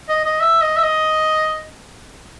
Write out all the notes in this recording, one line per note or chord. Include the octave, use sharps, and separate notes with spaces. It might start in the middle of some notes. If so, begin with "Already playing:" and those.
D#5
D#5
E5
D#5
E5
D#5